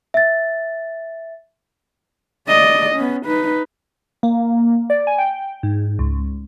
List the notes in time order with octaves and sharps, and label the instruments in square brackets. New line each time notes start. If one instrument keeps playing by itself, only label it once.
[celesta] E5 A6
[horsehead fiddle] D5 D#5
B3 C#4
D#4 B4
[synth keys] A#3
D5
G#5
G5
G#2
C#2